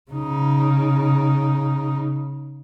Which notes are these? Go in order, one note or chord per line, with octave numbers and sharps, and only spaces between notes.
C#3 D#4